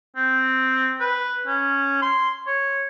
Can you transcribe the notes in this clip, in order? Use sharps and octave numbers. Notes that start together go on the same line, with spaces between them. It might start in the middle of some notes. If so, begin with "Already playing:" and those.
C4
B4
C#4
C6
C#5